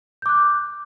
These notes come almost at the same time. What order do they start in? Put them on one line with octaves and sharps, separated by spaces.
G6 D6 F#6